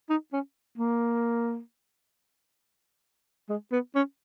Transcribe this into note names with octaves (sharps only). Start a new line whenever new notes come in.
D#4
C#4
A#3
G#3
B3
C#4